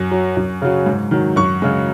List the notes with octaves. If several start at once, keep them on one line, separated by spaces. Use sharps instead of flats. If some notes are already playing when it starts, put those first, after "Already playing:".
Already playing: F#2
F#3
F#2
C#3 F#3
G#2
D#3 F#3
F#2 C#6
C#3 G#3